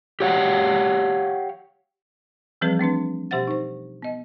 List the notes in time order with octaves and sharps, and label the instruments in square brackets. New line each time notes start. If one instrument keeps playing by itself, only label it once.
[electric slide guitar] G4 C#5 F5 F#5
[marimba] E3 F3 G3 C4 G#4 B4
A3 C4 D4 B4
B2 G4 C5 E5 F#5 A6
D#4 C5
B3 D#5